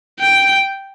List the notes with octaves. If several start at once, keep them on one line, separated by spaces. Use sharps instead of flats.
G5